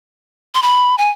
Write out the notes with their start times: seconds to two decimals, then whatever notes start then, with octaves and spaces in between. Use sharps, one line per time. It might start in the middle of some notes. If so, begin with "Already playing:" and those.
0.55 C6
0.62 B5
0.98 G#5